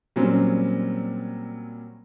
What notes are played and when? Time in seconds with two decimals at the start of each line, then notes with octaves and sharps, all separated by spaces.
0.16 A#2 F#3 G3 C4 C#4